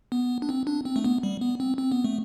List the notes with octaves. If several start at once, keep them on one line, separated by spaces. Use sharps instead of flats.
B3
D4
C4
D4
C4
A3
B3
G3
B3
C4
C4
B3
A3